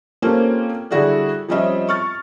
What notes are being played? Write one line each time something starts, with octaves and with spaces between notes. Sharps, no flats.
A#3 C4 C#4 F4 G4 A4
D3 G3 E4 F#4 G#4 D5
F3 G3 C4 C#4 D#5 E5
C#6 F6 A6